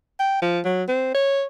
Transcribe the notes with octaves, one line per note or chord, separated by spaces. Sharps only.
G5
F3
F#3
C4
C#5